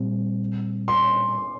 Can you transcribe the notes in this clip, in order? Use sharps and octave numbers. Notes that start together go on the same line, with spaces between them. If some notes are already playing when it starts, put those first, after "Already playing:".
Already playing: A#2 G3 C4
C6